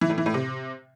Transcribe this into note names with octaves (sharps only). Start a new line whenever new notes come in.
E3
A2
E3
A2
C3